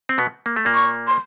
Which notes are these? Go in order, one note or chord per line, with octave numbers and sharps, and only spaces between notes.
C4
B2 B3
A#3
A3
A#2 A#3
C#6
C6